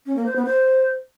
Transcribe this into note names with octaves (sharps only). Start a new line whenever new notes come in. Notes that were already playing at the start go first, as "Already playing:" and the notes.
C#4
A#3
C5
B3
C5